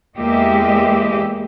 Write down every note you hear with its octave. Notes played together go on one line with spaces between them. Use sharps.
E2 G#3 A#3 G4 D#5 E5